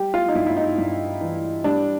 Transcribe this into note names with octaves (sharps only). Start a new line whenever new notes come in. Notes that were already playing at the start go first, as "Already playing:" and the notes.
Already playing: G3 G4
F4
D#4
G2 E4
E4
D#4
G2
E3
G3 D4